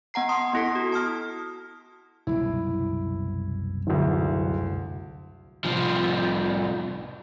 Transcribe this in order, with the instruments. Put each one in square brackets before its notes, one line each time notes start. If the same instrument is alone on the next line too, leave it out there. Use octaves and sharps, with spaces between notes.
[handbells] B3 F#5 A#5 C7
A5 C6 D#6
B3 E4 A4 B6
F#4
A5 D#6 F6
[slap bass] F#1 C2 B2 [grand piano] E4
[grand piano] D1 D2
[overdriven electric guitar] C2 F3